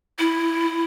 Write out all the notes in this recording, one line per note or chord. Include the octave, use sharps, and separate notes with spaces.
E4